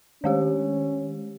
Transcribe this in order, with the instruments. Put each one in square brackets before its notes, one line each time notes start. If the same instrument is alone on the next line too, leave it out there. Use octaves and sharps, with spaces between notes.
[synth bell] D#3 G#3 G4 [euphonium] C#4